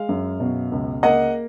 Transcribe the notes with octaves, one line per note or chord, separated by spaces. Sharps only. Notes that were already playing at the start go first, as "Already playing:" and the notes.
Already playing: G#3 F5
F#2
B2
C#2
A#3 D#5 F#5